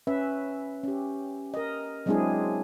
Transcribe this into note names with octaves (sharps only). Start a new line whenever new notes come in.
C#4 B4 E5
C#4 G4
A#4 D#5
F#3 G#3 C4 D4 E4 G#4